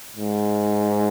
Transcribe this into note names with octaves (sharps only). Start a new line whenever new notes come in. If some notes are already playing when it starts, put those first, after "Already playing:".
G#2